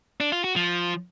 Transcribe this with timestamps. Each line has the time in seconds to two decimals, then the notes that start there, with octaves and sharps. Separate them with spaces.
0.20 D4
0.32 F4
0.44 F#4
0.56 F3